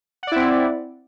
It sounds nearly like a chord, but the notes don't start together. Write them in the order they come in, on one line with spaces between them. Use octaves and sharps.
F#5 D5 E4 C4